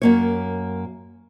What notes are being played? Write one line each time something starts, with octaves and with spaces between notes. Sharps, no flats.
F#2 A#3 C#5